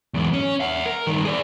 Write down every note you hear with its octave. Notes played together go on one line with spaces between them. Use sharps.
E2 G#2
C#4
E5 F#5
A#4
G2 D#3
G#4 D5